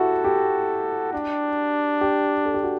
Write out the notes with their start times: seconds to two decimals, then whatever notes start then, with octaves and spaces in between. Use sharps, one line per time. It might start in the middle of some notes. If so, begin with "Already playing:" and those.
Already playing: E4 F#4 G4 A4
0.24 G4
1.13 D4
2.01 G4
2.45 A4
2.54 G4
2.63 F#4